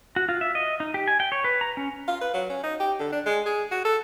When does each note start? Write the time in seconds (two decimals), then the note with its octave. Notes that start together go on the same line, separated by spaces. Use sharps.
0.16 F#4
0.29 F4
0.41 E5
0.55 D#5
0.80 D#4
0.94 G4
1.08 G#5
1.20 G5
1.32 C#5
1.44 B4
1.61 A#5
1.77 C#4
2.08 F4
2.21 B4
2.34 F#3
2.50 C#4
2.64 D#4
2.80 G4
2.99 D3
3.12 D4
3.26 G#3
3.46 G#4
3.71 F#4
3.85 A4